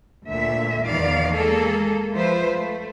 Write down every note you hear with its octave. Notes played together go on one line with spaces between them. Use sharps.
D2 A#2 E5
E2 D#3 F3 B3 D5 F5
G#3 A#3 G#4 A4
F3 F4 B4 C5 E5
A3